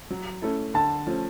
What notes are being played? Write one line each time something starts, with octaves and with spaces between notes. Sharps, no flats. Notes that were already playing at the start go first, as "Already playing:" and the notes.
F#3
A3 C#4 E4 A4
D3 A5
F3 A3 C#4